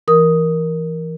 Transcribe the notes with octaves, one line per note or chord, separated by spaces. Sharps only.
E3 A#4 D#6